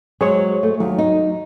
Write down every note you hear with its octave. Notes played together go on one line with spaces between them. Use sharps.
F#3 G#3 G#4 C5 C#5
A3
D#2 F#3
D#4